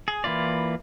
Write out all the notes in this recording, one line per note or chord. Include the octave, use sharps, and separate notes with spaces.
G#4
E3 A#3 E4 F4 D5